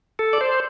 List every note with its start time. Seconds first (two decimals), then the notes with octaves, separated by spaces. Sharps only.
0.19 A4
0.33 D5
0.41 C5